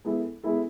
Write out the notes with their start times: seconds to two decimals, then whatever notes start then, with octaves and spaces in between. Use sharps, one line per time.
0.05 G#3 B3 E4 A4
0.44 G#3 B3 E4 A4